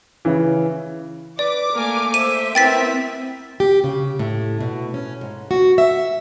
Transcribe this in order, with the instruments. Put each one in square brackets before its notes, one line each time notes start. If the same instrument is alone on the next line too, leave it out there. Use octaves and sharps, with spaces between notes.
[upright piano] C#3 E3
[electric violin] B4 [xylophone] D5 [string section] D6
[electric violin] A3 A#3 [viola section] A#4 G#5
[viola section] C5 E5 [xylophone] D#7
[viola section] B3 E4 E5 [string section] C4 [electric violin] A#4 [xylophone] G5 A6 B6
[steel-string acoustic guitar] G4
C#3
A2
B2
C#4
G#2
F#4
E5